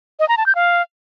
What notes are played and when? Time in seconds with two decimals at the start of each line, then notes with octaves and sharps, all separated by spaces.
0.20 D#5
0.29 A#5
0.37 A5
0.46 G6
0.55 F5